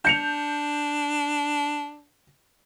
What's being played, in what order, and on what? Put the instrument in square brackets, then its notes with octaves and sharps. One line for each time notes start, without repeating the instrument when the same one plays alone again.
[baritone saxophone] D4 [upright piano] G6 C#7 F7